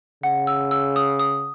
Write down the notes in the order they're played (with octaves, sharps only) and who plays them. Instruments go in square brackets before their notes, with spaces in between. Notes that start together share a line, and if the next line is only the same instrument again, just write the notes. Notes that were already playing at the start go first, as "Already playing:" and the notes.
[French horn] C#3 [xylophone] F#5
[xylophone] E6
E6
D#6
D#6